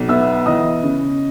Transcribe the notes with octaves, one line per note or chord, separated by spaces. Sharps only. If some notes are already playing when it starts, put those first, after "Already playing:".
Already playing: B1
B3 E5 E6
E3 D#5 D#6
C#3